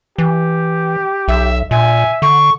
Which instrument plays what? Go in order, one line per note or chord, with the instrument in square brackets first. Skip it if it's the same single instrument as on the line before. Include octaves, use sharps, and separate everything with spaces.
[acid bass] E3 [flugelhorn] G4
[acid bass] B1 [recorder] E5
[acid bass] A#2 [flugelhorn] E5 [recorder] G#5
[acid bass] D3 [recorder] C#6